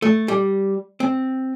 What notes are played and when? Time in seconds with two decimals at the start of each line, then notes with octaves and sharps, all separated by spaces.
0.02 A3
0.28 G3
1.00 C4